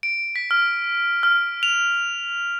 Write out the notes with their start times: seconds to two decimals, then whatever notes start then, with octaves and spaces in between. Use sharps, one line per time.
0.03 D7
0.36 B6
0.51 F6
1.23 F6
1.63 F7